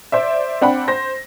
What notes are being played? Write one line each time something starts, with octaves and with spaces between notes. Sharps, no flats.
C5 D5 E5
C4 D4 F#5 G5 B5
C5 A#6